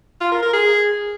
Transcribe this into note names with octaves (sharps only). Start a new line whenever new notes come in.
F4
A#4
A#4
G#4